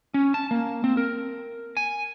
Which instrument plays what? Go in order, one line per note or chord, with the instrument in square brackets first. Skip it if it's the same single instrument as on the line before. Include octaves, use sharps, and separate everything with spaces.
[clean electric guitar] C#4
A5
A#3
C4
A#4
G#5